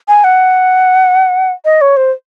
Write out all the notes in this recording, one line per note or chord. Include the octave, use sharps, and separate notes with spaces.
G#5
F#5
D#5
C#5
C5